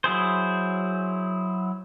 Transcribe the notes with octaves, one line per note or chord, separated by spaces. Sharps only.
F#3 E4 G#4 C5